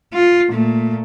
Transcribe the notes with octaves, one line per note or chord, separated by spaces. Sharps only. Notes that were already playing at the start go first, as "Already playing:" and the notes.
F4
A#2 A3